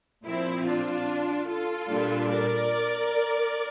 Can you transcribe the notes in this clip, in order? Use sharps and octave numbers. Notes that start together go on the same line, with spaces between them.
A#2 F3 C4 E4
D4 F4
F4 A4
A#2 G3 D4
A#4 D5